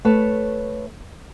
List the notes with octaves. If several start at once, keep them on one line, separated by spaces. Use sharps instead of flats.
A3 B4 C#5 A5